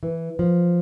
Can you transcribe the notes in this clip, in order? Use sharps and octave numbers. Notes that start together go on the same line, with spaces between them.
E3
F3